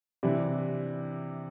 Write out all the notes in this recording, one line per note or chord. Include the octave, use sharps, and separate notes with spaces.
C3 E3 D4 E4